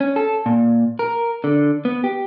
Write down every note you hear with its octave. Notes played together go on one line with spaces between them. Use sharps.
C#4
A4
A#2
A#4
D3
B3
G4